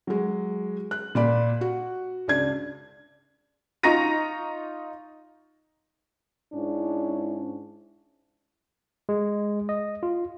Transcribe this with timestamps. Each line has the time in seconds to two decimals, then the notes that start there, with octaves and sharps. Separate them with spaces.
0.07 F#3 G#3
0.91 F#6
1.15 A#2 D5 B5
1.61 F#4
2.28 C#2 D4 G#6
3.83 D#4 F4 A#5 C#6 A#6 D#7
6.53 G#2 C#4 D4 E4
9.09 G#3
9.69 D#5
10.03 F4